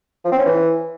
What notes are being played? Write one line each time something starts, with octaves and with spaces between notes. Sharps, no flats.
F3
C4
C#4
E3